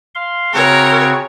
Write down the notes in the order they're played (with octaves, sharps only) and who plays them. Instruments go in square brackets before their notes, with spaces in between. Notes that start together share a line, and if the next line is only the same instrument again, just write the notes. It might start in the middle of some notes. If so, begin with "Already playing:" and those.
[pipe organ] F5 C6
[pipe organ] C#3 C4 F#4 [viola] A#4 C#5